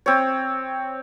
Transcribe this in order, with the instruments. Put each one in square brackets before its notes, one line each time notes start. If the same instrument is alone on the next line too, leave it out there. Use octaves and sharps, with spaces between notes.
[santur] C4 C#5